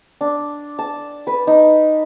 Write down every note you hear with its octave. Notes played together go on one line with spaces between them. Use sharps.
D4
A5
B4
D#4